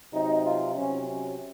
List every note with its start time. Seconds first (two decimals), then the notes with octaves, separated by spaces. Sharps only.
0.13 C3 F#3 D#4
0.45 F4
0.76 C3 F#3 C#4
1.07 C#4